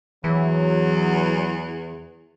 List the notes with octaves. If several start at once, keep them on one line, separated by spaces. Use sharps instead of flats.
E2 E3 F#3